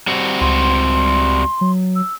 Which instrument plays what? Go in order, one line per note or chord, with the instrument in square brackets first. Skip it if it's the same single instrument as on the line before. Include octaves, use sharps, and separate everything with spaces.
[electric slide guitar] G3 C4 F#4
[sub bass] C#2 [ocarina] C6
[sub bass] F#3
[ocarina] E6